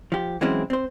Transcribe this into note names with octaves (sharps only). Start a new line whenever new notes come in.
F3 G4
E3 F#3 G#3 C4 C#4 E4
C4 C5